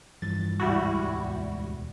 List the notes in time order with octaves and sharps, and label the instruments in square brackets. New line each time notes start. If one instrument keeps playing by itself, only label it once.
[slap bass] G2 E3 F3 [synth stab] A6
[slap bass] E1 D2 G#2 [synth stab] G3 E4 F#4